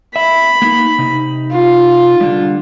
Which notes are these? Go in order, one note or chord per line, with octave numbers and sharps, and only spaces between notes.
E5 B5
A#3 D#4
C3 D#4
F4
D3 G3